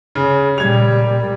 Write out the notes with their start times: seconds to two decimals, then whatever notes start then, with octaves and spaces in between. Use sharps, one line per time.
0.15 C#3
0.58 A#2 G3 G#6 F7